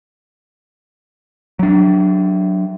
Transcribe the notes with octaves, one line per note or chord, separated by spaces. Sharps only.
F#3 D4